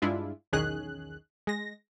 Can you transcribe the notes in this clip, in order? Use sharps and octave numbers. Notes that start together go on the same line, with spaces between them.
G2 G#3 D4 E4 F4
B1 E2 D#3 C#4 G#4 F#6
G#3 A#6